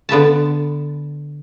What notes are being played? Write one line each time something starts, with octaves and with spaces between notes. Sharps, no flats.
D3 B3 E5 A5